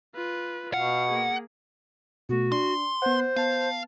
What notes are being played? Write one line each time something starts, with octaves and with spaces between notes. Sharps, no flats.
F4 B4
B2 F5 F#5
A#3 G#4
B2 A3 F#4
D4 C6
B3 C5 F#5
B3 F5 A5